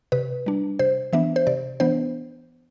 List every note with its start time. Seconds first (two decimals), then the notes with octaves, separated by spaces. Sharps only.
0.12 C3 B4
0.46 G3 D4
0.79 C3 C5
1.13 E3 B3 D4 E5
1.36 C5
1.47 C3 D5
1.80 E3 B3 D4 C5